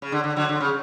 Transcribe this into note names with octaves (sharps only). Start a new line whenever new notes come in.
C#3
D3
D3
D3 F#3
D3
C#3